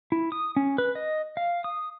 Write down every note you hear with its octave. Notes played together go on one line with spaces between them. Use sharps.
E4
D#6
C#4
B4
D#5
F5
D#6